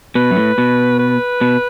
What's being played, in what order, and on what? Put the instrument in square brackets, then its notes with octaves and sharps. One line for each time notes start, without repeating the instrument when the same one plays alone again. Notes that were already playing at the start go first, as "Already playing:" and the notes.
[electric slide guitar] B2 [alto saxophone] B4
[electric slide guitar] F#2
A2
B2
[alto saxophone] B4
[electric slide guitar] B2